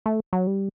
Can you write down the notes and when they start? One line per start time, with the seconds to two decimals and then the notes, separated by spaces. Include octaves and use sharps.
0.06 A3
0.33 F#3
0.47 G3